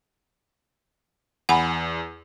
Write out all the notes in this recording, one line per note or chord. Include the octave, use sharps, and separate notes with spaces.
E2 F#5 G#5 B5